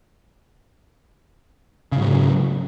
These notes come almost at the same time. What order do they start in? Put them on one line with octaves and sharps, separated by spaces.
C#3 G#2 F#3